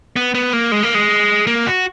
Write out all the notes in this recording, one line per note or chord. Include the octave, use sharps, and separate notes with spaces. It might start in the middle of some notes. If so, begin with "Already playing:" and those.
B3
B3
A#3
G#3
A#3
G#3
A#3
F#4